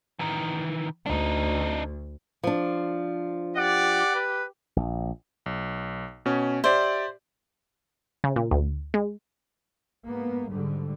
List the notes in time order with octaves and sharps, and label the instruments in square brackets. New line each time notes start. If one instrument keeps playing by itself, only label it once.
[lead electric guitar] D#3 E3
[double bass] D2 [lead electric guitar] D4 D#4
[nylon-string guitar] F3 D4
[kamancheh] G4 [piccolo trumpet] D5 [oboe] F#5
[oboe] B4
[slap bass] A#1
[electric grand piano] B1
B2 C#4
[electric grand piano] G4 D5 E5 [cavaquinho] C5
[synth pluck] C#3
A#2
D2
G#3
[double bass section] G#2 A#3 B3
G#2 D3 G3